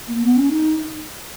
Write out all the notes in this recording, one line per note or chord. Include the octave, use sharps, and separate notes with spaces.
A#3
B3
C#4
D#4